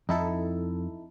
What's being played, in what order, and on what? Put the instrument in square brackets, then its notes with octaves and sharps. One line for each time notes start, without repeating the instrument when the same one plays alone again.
[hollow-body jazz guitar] F2 [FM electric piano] D#4 E4 A4